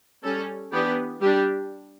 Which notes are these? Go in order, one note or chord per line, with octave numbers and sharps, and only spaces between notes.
G3 C#4 A4
E3 B3 D4 G4
G3 D4 G4